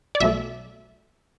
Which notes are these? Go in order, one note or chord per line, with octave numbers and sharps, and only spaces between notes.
D5
B1 B2 F#3 A3 E5